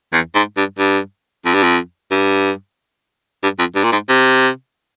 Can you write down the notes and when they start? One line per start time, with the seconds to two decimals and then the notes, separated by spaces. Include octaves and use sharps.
0.13 E2
0.35 G#2
0.57 G2
0.79 G2
1.45 F2
1.54 G2
1.63 F2
2.11 G2
3.43 G2
3.59 F2
3.75 G2
3.84 A#2
3.92 G#2
4.09 C3